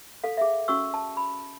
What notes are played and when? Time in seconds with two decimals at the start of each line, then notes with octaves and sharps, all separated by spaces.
0.24 A4 F5
0.37 G#4 E5
0.68 C#4 F#4 C#6 E6
0.94 A5
1.17 B5